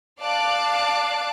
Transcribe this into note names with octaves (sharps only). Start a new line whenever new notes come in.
D5 F5 A5 D6 F#6